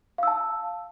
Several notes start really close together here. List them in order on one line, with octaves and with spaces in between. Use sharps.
F5 E6 A5